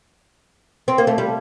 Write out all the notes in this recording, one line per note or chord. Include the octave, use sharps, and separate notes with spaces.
C4
A#3
A3
G3